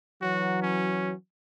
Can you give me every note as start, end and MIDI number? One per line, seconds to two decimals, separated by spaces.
0.22 1.13 52
0.22 1.13 54
0.22 0.60 66
0.62 1.14 61